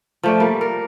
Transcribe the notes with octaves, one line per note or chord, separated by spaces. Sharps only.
F3 A3 D5
G3 A#3
A#4